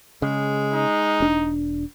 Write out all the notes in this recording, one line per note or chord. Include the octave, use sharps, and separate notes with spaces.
C#3 G#3
D#4
E1 D4